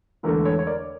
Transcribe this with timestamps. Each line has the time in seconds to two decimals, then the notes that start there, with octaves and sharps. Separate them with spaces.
0.23 E1 E2 D3 A3 A#4
0.45 A4 C#5
0.59 C#5
0.67 A#4 D5